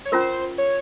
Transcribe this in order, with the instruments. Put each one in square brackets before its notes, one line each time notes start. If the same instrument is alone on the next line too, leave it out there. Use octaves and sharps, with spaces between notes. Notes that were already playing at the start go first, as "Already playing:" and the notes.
[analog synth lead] C#5
[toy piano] C#4 F4 A#4 [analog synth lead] C5
[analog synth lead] C#5